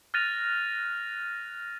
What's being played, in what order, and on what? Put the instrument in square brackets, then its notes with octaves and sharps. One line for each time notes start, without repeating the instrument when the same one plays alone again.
[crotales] F6 F#6 A6 A#6 D#7 F7